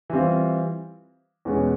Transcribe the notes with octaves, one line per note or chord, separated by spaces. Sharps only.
E3 G3 C4 F4
E2 B2 G#3 C#4 F#4